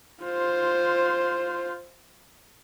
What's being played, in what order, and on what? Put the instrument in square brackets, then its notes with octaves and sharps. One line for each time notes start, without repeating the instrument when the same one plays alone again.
[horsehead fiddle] F4 C5